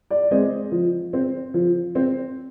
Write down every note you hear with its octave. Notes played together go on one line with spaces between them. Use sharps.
D5
G#3 C4 D#5
F3
C4
F3
C4